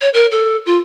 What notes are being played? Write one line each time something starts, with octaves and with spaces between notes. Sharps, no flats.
C#5
A#4
A4
F4